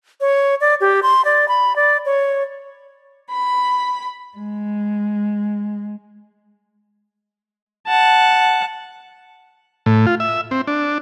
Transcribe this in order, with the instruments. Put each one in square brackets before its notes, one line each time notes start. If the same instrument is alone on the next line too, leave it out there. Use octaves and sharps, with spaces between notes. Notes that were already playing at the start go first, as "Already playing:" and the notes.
[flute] C#5
D5
G4
C6
D5
B5
D5
C#5
[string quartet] B5
G#3
[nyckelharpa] F#5 A5
[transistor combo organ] A2
F4
E5
C4
D4